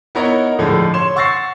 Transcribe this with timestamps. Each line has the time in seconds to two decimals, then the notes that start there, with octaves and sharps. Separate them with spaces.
0.15 B3 D#4 E4 A#4 C#5 A#5
0.59 A2 D3 F3 G#3
0.94 C#5 C6 E7
1.16 F#5 C#6 E6 A6 A#6 C7